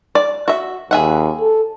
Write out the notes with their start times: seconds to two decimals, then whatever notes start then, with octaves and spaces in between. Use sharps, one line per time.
0.15 D5
0.48 F#4 E5
0.91 D#2 G#4 E5 F#5
1.41 A4